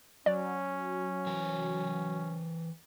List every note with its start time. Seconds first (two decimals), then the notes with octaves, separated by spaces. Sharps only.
0.26 F#3 C#4 D5
1.26 E3 A#4 G#5